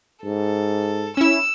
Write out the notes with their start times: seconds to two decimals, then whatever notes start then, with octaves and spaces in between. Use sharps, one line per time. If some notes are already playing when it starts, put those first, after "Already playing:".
0.25 G#2 A4
1.17 C#4 E4 E6 E7